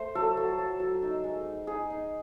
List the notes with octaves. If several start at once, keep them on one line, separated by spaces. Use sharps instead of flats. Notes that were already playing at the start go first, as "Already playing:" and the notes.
Already playing: A3 C5
F#3 A4
F#3
F#3
F#3
D#4
G#3
D#4
D#4 G#4
D#4